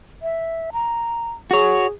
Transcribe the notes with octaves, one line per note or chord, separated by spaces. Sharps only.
E5
A#5
F#4 G#4 C#5